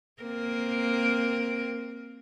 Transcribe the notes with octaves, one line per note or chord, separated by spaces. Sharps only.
A#3 C4 A#4